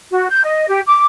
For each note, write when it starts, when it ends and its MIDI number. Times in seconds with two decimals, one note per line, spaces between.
0.11 0.27 66
0.30 0.42 91
0.44 0.65 75
0.68 0.81 67
0.87 1.06 86